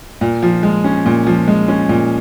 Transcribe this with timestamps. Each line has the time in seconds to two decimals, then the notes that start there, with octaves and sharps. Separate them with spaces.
0.21 A#2
0.43 F3
0.63 G#3
0.84 C#4
1.06 A#2
1.27 F3
1.48 G#3
1.68 C#4
1.89 A#2